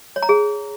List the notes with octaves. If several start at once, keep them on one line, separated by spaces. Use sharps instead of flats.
C#5
A#5
G#4